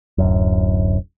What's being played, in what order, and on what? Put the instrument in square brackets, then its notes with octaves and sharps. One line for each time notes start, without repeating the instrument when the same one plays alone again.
[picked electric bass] D1 F#2